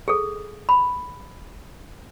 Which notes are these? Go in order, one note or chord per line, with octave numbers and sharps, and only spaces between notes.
G#4 A4
B5